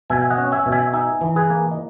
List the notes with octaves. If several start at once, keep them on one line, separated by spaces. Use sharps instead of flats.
B2 E5 G#5
G#5
D#5 F#5
C#4
E5 G#5
B2
E5 G#5
D#4 E5 G#5
E3
G#4 B4
A#3
D#5